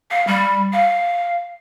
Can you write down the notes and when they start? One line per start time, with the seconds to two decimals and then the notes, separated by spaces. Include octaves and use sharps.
0.11 F5
0.27 G3
0.73 F5